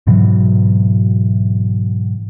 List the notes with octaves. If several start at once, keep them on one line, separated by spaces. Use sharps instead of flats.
G#2 B2 E3 F#3